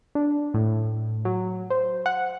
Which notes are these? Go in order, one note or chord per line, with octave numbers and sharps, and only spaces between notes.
D4
A2
F#3
C5
F#5